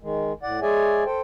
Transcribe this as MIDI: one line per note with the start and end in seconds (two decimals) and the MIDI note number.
0.03 0.33 51
0.03 0.33 56
0.43 0.60 45
0.43 0.60 74
0.43 0.60 78
0.62 1.04 56
0.62 1.04 68
0.62 1.04 73
0.62 1.04 74
0.62 1.04 76
0.62 1.04 80
1.06 1.21 69
1.06 1.21 72
1.06 1.21 79